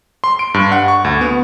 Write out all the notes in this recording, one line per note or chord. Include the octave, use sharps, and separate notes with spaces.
C6
D7
G2
F#5
C#6
D2
B3